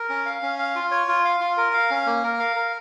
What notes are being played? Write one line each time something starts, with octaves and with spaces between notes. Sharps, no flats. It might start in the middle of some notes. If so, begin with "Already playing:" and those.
Already playing: A#4
C#4
F5
C#4
F5
F4
C#5
F4
F5
F4
A#4
F5
C#4
A#3
A#4
F5
A#4